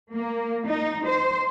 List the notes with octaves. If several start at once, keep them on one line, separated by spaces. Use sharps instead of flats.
A#3
D#4
C5